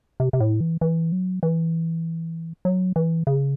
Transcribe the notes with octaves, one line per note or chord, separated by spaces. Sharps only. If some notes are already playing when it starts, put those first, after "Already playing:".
C3
C3
A2
E3
E3
F#3
E3
F#3
E3
C#3